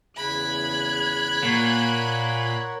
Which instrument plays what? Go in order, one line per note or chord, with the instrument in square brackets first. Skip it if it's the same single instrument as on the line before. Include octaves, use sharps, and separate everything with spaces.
[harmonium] E2 C#3 [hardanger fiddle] B5 [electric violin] F#6 G#6
[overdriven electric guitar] A#2 [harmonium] A#4 C#5 F#5